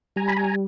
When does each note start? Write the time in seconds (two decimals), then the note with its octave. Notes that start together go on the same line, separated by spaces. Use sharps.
0.16 G3 G#5 A#5
0.27 B5
0.37 G#5 A#5